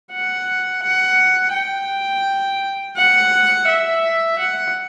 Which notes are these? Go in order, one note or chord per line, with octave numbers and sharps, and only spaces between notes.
F#5
F#5
G5
F#5
E5
F#5